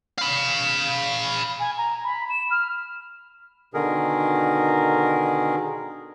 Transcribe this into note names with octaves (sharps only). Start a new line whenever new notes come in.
F5 B5
G#5
A#5
B5
E7
F6
B2 D3 D#3 G#4 A#4